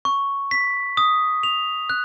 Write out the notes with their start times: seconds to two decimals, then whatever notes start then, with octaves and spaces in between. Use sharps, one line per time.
0.05 C#6
0.51 B6
0.97 D#6
1.43 F7
1.90 F#6